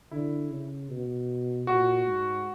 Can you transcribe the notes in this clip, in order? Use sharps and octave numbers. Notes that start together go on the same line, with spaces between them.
D3 E4
C#3
B2
A#2 F#4
G#2